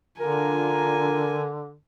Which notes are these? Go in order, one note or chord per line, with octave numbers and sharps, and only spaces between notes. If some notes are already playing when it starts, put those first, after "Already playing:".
D3 D4 F4 A#4 G#5 A#5